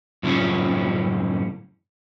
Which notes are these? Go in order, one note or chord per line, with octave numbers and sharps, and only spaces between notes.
F#2 A2 C#3 F3 C4 C#4